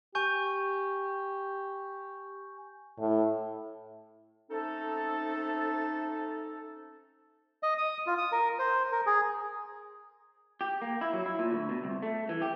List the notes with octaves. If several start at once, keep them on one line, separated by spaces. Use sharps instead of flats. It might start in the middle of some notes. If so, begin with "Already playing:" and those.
G4 G#5 C#6 G6
A2
A3 C4 C#4 D#4 A4
D#5
D#6
F4
D#6
A#4
C5
A#4
G#4
G4
A#3
E4
F#3
E4
A#2
D2
B2
C2
A3
E3
G4